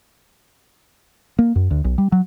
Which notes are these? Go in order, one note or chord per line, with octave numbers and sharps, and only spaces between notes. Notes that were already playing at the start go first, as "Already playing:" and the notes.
A#3
F#2
D2
B1
G3
F#3